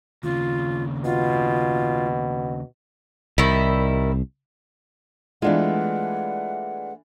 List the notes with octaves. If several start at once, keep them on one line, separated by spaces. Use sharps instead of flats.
D#2 C#3 F4
B2 F4
C2 D#3 G3 E4
E3 G#3 A3 B3 D4 F4 F#5